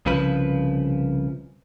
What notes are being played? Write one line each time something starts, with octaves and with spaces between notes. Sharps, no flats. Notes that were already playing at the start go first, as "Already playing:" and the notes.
C2 C#3 F3 B4